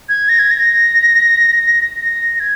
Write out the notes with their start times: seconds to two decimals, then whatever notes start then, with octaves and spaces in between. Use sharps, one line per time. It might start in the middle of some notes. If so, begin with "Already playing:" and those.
0.09 G#6
0.29 A#6
0.39 G#6
0.50 A#6
2.02 A#6
2.40 G#6